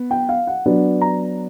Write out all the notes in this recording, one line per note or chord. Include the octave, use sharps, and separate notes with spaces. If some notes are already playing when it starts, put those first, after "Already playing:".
Already playing: B3
G5
F5
F#5
F#3 B3 D4
A#5